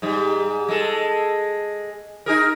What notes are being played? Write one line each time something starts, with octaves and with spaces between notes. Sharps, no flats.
G#2 G3
G#3 A4
D#4 G#4 A#4